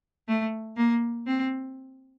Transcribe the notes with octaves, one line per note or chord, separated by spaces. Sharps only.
A3
A#3
C4